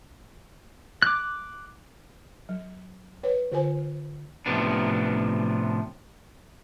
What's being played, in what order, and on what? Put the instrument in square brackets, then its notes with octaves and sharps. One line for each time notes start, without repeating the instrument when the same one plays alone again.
[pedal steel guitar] D6 F#6
[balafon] F#3
B4 C#5
D3 F4 A#4 C5 G#5
[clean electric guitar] A2 C3 F3 B3 D4